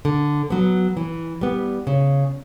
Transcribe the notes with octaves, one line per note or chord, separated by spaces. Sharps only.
D3
F#3 B3
E3
G3 B3
C#3